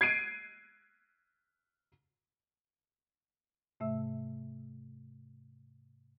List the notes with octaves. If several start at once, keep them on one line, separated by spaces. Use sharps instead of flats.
G#6 C7 D7 D#7
G#2 C3 A3 E5 E6